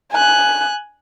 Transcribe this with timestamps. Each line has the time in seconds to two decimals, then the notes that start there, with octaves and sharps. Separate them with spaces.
0.12 G#5 F#6